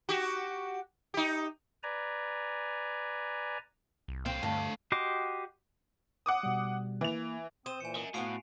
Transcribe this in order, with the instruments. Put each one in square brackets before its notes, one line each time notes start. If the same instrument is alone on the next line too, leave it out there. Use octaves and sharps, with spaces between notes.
[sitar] F#4 G4
D#4 G4
[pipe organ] B4 D5 G#5 A#5
[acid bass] C2
[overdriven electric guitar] D3 F5 [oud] C4
[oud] D2 [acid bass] G2 [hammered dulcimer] A5
[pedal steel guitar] F#4 G4 D#5 C6 D6
[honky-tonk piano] F#5 D6 D#6
[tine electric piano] B2 G3
[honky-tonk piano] E3 F7 [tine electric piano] A#3
[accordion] C4 D#6 [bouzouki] C5 [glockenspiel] D#7 E7
[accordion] A#2 E3 [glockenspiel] G#5 C#7
[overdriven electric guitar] A#4 E5 [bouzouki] D#5
[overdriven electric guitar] A2 [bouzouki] B3 C#4 F4 [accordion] F#4 [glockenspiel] C7 D7 F7